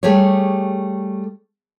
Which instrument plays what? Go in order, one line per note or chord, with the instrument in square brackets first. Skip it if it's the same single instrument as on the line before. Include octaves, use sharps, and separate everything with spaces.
[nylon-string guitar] G3 A3 G4 G#4 C#5